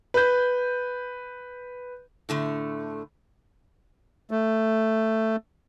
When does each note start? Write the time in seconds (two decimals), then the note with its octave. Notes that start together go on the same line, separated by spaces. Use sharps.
0.14 B4 G6
2.29 A2 D3 A3
4.31 A3